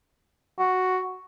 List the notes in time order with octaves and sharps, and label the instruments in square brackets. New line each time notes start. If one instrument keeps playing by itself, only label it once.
[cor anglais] F#4